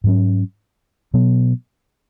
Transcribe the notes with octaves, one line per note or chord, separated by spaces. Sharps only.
G#2 F#3 C#4
B2 F#3 B3